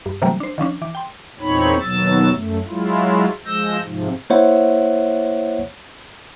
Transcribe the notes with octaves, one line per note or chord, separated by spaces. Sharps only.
G2
C3 E3 F#3 G3 A3 A#3
D4 C5
D#3 F3 C#4 D4
E3 D6
G5 C6
E2 A#2 C4 D#4 C#5 B5
D#2 B2 F#3 E6 A6
F#2 A3
F#3 G#3 E4 F4
F3 G#3 E6 G6 A#6
G#2 C3 F3
A#3 E4 C5 C#5 E5 F#5